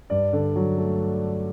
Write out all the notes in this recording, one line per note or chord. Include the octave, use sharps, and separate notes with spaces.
G2 D5
D3
F#3
A3